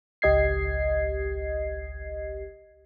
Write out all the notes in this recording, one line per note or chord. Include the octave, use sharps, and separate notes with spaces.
G#1 C#2 G4 D#5 G#6 C7